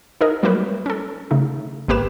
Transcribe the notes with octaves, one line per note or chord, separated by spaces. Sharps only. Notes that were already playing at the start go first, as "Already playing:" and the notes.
D#4 G#4 A#4 D#5
F#3 G3 A3 A#3 B4 C#5
C#4 A4
C#3 A3 D#4
G#1 A#3 G4 B4 E7